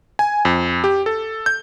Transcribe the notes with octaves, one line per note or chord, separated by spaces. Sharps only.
G#5
F2
G4
A4
G6